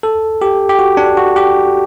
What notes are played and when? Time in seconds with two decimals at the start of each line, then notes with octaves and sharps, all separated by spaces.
0.03 A4
0.42 G4
0.69 G4
0.79 F#4
0.97 D4
1.17 F#4
1.36 G4